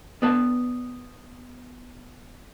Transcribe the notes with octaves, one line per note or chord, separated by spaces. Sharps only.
B3 D4 B4 F5 A5